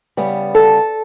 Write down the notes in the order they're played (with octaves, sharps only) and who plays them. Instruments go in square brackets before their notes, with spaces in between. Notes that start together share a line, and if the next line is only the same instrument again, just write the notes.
[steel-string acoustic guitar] C#3 G3 B3
A4